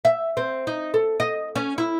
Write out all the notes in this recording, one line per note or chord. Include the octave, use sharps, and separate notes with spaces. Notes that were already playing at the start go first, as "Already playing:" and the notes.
E5
C4
D#4
A4
D#5
C#4
E4